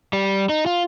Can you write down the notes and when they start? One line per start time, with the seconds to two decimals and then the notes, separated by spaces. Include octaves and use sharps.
0.13 G3
0.49 D#4
0.66 F4